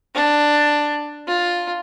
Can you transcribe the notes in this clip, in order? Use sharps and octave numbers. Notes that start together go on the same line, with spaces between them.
D4
F4